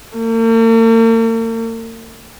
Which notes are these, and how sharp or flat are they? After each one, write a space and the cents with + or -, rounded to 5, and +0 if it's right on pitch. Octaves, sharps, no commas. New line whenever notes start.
A#3 -45